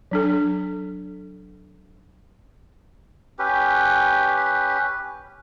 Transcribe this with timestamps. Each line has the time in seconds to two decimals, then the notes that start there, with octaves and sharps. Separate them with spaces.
0.11 F#3 D4 A4
3.39 C#4 G4 B4